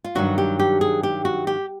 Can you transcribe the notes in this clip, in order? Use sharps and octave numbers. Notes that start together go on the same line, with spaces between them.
F4
G2 D#3 F#3 F#4
G4
G4
G#4
G4
F#4
G4